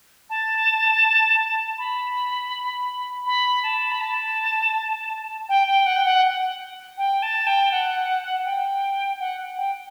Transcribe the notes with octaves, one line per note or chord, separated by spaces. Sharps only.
A5
B5
B5
A5
B5
A5
G5
G5
F#5
G5
F#5
G5
A5
G5
F#5
G5
F#5
G5